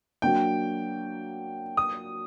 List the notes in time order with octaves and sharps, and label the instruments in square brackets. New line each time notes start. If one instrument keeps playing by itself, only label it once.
[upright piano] F#3 A#3 D4 [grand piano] G5
[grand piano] D#6